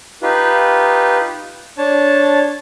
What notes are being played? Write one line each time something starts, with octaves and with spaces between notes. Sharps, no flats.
D#4 F4 G4 B4
D4 C#5 A5